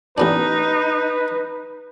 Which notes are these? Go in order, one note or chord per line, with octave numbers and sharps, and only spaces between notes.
A1 B3 D4 D#4 B4